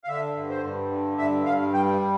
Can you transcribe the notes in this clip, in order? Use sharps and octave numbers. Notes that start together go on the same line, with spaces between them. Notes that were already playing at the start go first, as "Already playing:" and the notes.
F5
D3 E5
G2
C5
G2
D3
G2 E5
G2 F5
G3 G5